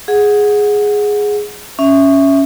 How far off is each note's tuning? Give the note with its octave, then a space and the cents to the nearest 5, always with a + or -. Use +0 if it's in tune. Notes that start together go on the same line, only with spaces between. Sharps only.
G#4 +0 F#5 -15
C#4 +0 E5 +0